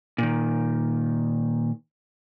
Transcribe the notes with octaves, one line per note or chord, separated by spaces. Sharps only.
A#2 D#3